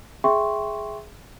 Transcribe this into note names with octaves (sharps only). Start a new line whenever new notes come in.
G#4 E5 G5 C6 C#6